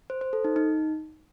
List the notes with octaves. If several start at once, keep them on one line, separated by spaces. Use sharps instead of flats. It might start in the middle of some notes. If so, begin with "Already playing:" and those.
C5
C5
A4
D#4
D#4